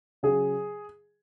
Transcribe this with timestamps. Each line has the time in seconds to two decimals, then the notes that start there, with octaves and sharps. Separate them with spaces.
0.23 C#3 F#3 G#4